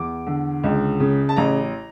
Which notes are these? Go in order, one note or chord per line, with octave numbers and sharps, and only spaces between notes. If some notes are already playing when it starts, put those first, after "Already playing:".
Already playing: E2 D6
D3
C#2
C#3
A5
A1 A#5